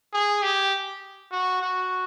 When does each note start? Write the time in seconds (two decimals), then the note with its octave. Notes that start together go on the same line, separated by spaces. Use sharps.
0.14 G#4
0.43 G4
1.32 F#4
1.62 F#4